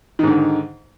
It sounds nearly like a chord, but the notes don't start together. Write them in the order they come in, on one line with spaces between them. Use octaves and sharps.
D#3 G#2 D3